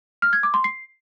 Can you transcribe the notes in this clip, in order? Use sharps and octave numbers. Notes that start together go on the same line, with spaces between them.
F6
G#6
D6
C6
C7